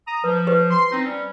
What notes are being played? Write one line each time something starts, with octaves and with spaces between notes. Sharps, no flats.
A#5 D#6
F3 B4
G4 B4 C5
C6
C4 D#4
G3 C#4